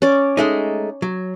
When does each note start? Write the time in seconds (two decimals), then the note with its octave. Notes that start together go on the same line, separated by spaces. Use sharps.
0.02 C#4 D5
0.37 G#3 A3 D#4
1.02 F#3